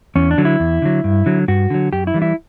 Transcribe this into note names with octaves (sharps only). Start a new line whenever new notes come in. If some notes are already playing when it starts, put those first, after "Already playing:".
E2 C#4
D4
D3 F#3
E4
E2
D3 F#3
G2
D3 F#3
G2 F#4
D3 F#3
F#2 G4
E4
E3 G3
E4